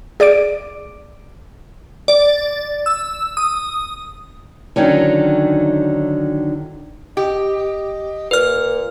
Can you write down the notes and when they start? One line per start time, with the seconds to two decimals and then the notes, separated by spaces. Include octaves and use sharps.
0.20 G#4 D5 D6 D7
2.08 D5
2.86 E6
3.37 D#6
4.76 D3 D#3 F#3 C#4 D#4
7.17 G4 D#5
8.31 A#2 B4 F6